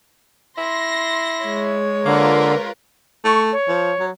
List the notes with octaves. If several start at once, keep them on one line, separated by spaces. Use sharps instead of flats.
E4 C6 A#6
G#3 C#5
D3 A#3 F4 A#4 B4
A3 C#6
C#5
F3
F#3